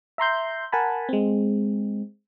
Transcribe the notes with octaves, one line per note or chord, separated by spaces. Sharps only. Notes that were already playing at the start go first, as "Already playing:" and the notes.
E5 A#5 C6 G6
A#4 F#5 G#5 A5 B5
G#3 C4